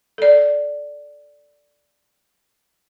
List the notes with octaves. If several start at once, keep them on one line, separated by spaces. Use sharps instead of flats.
A4 D5